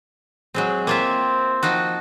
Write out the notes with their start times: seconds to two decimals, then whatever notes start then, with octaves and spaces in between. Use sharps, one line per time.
0.54 F#3 G#3 C4
0.87 A#3 C4 F4 E5
1.63 F3 D#4 F#4